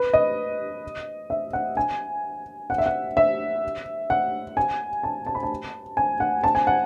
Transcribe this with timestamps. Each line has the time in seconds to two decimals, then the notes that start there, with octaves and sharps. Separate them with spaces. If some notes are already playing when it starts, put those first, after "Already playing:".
Already playing: B4
0.14 D#5
1.30 E5
1.53 F#5
1.77 G#5
2.70 F#5
2.78 E5
2.86 F#5
3.17 E5
4.10 F#5
4.57 G#5
5.03 A5
5.26 A5
5.35 B5
5.43 A5
5.97 G#5
6.20 F#5
6.44 A5
6.55 G#5
6.67 F#5